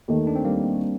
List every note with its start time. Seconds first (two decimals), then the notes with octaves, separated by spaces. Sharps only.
0.08 D#2 D#3 A3
0.27 D4
0.36 C4
0.45 G3 A#3